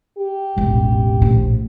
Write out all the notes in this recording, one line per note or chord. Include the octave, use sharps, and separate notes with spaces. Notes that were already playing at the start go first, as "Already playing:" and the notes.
G4
E1 A1
A#1 A2